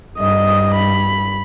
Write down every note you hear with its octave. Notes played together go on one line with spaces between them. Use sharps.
G2 D#5 D#6
B5